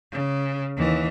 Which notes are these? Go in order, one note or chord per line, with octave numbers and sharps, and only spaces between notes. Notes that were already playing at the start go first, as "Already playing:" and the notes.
C#3
D#2 E3